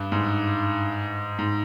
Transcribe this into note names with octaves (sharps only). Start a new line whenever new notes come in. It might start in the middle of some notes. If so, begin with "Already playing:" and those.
Already playing: G2
G#2
G#2